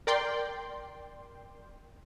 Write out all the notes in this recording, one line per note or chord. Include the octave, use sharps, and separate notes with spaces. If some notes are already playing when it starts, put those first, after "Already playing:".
A#4 D5 G5 C6